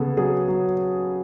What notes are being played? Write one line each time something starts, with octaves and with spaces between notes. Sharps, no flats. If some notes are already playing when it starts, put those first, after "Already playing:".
Already playing: C#3 B3 G#4 A4
F#3 G#4
F#3